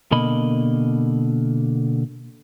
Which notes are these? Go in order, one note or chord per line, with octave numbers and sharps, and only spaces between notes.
B2 D3 A#3 D#5 B5